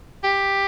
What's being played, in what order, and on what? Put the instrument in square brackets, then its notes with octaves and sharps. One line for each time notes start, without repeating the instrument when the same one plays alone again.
[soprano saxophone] G4